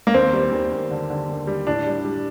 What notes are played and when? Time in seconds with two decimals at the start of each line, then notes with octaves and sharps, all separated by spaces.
0.07 A#3
0.14 D#2 C4
0.33 G3
0.52 D#2
0.72 D#2
0.91 D3
1.10 D3
1.29 D#2
1.47 G3
1.67 A2 D4
1.87 G3
2.05 G3